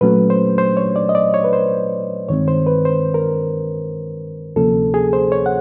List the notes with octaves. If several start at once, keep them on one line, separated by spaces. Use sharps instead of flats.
A#2 F#3 A3 C#4 B4
C5
C5
C#5
D5
D#5
D5
C#5
B4
C5
G2 D#3 G#3 C4 C#5
C5
B4
C5
A#4
D2 C3 F3 A#3 C#4 A4
G#4
C5
C#5
F#5